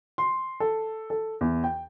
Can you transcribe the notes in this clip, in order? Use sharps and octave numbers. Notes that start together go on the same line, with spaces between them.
C6
A4
A4
E2
G5